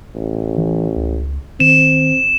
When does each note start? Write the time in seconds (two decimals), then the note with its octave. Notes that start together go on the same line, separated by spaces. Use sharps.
0.15 A1
0.58 E3
0.96 C#2
1.60 D#3 C4 E7